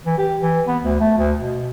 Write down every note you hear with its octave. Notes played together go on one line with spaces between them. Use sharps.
E3
G4
E3
B3
D2
A3
D2
B2